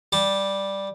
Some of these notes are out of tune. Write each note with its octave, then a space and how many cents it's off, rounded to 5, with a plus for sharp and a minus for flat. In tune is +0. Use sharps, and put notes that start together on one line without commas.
G3 +0 A5 +0